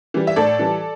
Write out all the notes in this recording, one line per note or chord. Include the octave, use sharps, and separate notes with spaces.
E3 G3
E5
A2 A4 D5
E3 G3